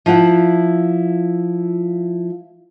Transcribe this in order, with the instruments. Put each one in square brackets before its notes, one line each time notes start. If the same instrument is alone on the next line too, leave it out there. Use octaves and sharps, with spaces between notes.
[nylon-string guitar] F3 E4 F4 F#5